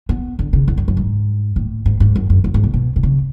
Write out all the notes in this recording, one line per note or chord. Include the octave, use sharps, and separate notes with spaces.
B3
D3
C#3
E2
F#2
F#2
G#2
A2
G#2
G#2
F#2
F#2
F#2
G#2
B2
B2
B2
C#3